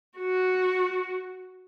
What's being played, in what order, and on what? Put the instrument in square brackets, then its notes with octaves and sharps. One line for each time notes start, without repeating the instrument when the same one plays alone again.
[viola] F#4